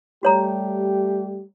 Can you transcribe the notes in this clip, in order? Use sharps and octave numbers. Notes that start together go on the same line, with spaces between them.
G3 A3 F#4 G4 C#5 A#5